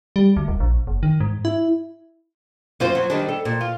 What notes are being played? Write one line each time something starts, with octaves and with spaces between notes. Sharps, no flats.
G3
D2
D#1
A#1
F#1
D#3
G#2
E4
F#2 F4 C5
F#3
D#3 G3 D4
A4
A#2
F4